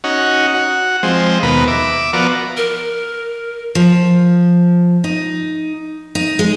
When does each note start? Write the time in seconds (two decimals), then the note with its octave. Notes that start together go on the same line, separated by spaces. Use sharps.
0.04 C#4 D#4 F#4
0.54 F#4
1.03 F3 G#3 C4
1.43 D#2 B2 A#4 B4
1.68 E5 D6
2.13 F3 B3 F#4 A#4 D5
2.57 A#4
3.75 F3
5.04 D#4
6.15 D#4
6.39 G#3